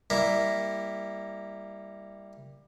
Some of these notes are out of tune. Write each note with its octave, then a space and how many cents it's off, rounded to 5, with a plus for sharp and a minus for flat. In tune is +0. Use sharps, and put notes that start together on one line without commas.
G3 +15 A#3 +0 E4 +0